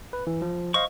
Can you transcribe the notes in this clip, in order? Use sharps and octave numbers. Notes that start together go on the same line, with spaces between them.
B4
E3
F3
C5 D#5 F5 C#6